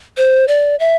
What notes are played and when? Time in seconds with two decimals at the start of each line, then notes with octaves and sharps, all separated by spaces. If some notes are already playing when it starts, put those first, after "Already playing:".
0.17 C5
0.48 D5
0.80 E5